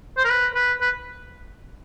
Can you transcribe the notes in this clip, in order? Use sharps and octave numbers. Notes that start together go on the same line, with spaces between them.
C5
A#4
B4
B4
B4